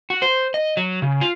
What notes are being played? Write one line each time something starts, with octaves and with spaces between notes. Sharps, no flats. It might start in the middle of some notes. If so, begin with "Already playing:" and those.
F#4
C5
D#5
F#3
C#3
F4